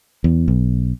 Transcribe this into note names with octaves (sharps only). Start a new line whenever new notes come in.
E2
B1